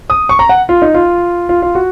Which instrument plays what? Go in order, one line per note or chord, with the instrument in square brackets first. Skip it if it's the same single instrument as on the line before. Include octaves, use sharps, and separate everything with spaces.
[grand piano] D#6
C#6
A#5
F#5
F4
D#4
F4
F4
F4
F#4